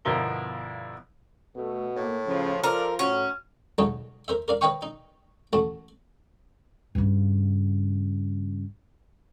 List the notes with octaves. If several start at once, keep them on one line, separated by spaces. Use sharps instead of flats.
G1 B2 F3 E4 A#4 G7
B2 A3
A2 A#3
C#3 F3
F3 F4 A4 A#4 D5
A2 F#3 C#4
B1 C#3 F#3 D#4 C#5 A5
A#4 C5 E5
A#4 D5 F5
B4 C#5 D#5 F5 G5 C#6
D#4
A1 A3 F#4 A5
G2 C#3